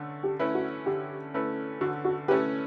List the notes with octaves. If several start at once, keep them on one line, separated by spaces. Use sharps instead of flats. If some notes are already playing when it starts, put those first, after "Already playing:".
Already playing: D3 A3 C#4
G4
A3 C#4 E4 B4
F#4
D3 G4
A3 C#4 E4 B4
D3 F#4
F#4
A3 C#4 E4 G4 B4